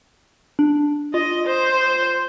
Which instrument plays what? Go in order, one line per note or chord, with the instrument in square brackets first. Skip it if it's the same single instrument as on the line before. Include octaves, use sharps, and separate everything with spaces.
[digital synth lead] D4
[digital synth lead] F4 [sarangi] D#5
[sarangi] C5